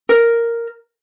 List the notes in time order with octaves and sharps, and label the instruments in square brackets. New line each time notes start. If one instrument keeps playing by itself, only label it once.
[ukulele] A#4